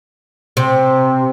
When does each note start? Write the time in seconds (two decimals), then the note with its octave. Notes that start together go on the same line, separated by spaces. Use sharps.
0.57 C3